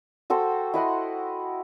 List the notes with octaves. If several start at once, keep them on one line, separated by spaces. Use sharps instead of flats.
F#4 A4 C5 G5
E4 D#5 F#5 C6